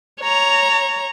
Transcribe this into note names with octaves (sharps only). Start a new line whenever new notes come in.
C#5 A#5